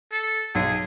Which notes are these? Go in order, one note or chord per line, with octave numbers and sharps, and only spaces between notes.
A4
B1 G#4